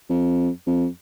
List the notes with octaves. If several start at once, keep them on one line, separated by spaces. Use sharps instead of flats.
F2
F2